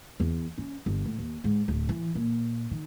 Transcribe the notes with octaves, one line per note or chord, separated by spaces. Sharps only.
E2
C#4
G1
A2
D#2
G#2
D1
E3
A#2
D#3